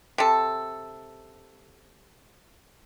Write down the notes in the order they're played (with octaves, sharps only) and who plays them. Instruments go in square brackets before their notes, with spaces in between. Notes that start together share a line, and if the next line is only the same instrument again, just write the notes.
[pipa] C3 A4